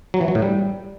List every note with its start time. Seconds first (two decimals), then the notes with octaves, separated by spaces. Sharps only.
0.14 F#3
0.21 E3
0.28 F#3
0.35 A2
0.42 G3